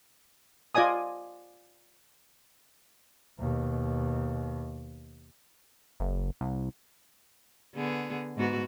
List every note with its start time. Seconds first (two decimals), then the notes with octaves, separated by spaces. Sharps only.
0.75 F4 D5 D#5 G#5 D#6
3.39 D#2 B2
6.00 F#1
6.41 C2
7.75 D3 B3 G#4
8.37 G#2 B3 F#4